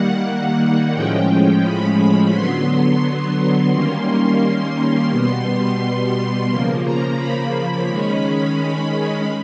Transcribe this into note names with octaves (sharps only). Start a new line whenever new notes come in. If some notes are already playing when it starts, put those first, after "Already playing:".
Already playing: D#3 G3 A#3 F#5
A2 F3 G#3 C#4 G5
G5
B5
D3 F#3 B3 C6
D#3 G3 A#3 C#4 C6
B2 G3 B3 C6
C#3 F3 A#3
A#5
B5
D#3 G#3 C#4
B5